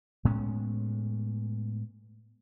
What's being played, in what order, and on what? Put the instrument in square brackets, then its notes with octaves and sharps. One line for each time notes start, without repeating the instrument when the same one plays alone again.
[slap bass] A2 G#3 B3 C#4